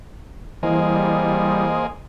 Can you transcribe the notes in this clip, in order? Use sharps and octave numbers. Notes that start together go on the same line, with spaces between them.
E3 G3 A#3 E4 G#4 C5 D#5